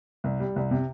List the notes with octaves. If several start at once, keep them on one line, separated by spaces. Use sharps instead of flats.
C2
G3
C2
C3